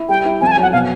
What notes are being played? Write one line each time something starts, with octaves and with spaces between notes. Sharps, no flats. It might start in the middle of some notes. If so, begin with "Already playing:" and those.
Already playing: E4
G3 G5
E4
F2 G#5
A5
G#5
F#3 F#5
B2 F5